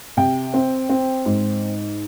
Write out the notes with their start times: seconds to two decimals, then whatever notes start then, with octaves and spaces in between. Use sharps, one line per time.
0.17 C3 G5
0.54 C4
0.89 C4
1.26 G#2